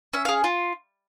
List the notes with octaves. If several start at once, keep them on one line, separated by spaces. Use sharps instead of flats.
C#4 E5
F5
G#4
F4